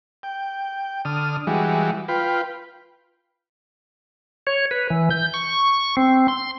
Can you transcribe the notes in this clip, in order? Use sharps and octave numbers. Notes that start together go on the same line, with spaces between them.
G5
D3 D#6 F6
E3 G3 G#3 F#4
F4 B4 G5
C#5
B4
E3
G6
C#6
C4
C6